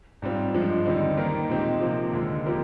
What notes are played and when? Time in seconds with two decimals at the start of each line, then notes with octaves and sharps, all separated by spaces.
0.22 G#2 G3 C4 F4
0.54 G2 F3 G#3
0.86 D#2 D3 G3 C4 D#4
1.17 D#3 A#3 D#4 A#4
1.49 A#2 G#3 C4 D#4 G4
1.82 C3 F3 A#3
2.13 D#2 D3 G#3
2.46 A#2 F3 C4 G4 A#4